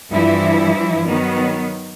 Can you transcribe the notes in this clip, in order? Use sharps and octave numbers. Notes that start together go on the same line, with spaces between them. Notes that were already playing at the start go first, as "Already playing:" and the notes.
G2 E3 F3 E4
D#3 F#3 B3